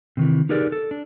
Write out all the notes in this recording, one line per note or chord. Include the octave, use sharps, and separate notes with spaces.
C3 D#3 E3
D#4 G4 G#4 A#4 B4 D5
A4
D4